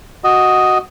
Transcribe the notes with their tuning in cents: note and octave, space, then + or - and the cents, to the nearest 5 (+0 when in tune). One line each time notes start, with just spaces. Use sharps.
F#4 +0 D#5 +0